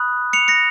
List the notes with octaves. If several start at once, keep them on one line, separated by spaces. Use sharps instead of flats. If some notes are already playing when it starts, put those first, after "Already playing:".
Already playing: B5 D#6 F#6
C#7 F7
A#6 C#7